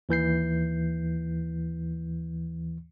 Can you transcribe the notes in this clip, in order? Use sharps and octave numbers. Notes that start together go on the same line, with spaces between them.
D#2 E3 G6 C7